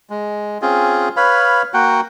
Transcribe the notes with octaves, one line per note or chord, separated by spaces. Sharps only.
G#3
C4 C#4 F4 G#4
B4 C#5 F5 B5
A#3 F#4 F#5 G5